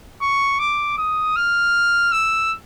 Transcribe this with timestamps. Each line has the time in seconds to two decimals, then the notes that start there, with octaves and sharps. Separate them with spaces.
0.22 C#6
0.59 D6
0.98 D#6
1.36 F6
2.12 E6